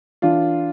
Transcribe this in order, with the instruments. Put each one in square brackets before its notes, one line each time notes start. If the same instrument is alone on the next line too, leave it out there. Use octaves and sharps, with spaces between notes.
[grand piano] E3 D4 F4